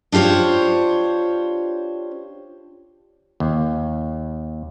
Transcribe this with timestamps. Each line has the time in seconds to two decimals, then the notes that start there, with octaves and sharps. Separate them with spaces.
0.12 D4 F4 G4 C5 C#5
3.40 D#2